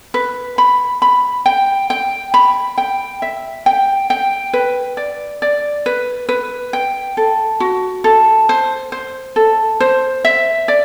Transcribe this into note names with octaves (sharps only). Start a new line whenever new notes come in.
B4
B5
B5
G5
G5
B5
G5
E5
G5
G5
B4
D5
D5
B4
B4
G5
A4
F#4
A4
C5
C5
A4
C5
E5
D5